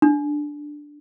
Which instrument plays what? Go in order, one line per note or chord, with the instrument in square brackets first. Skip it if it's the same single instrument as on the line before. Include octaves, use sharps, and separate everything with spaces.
[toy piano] D4